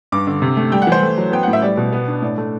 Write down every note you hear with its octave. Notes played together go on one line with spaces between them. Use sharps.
G2 D6
D3
C3
A3
G3 G5
F#5
E3 C5
A3
F#3
B3 G5
A2 F#5
E5
G3 D5
B2
B3
D4
A2 D5
A3